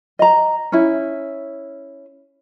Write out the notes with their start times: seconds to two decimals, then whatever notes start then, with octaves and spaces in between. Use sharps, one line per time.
0.19 D#5 A#5
0.72 C#4 E4